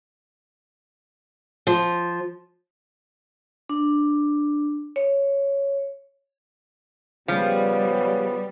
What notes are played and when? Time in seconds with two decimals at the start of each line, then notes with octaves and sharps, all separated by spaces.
1.67 F3
3.69 D4
4.96 C#5
7.28 C#3 F3 G3 B3